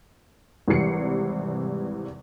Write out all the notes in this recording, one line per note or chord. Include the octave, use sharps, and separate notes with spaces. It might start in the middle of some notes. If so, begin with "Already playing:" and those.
G#1 C3 E3 G3 C7 C#7